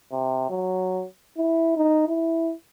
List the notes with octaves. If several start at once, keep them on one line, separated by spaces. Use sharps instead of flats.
C3
F#3
E4
D#4
E4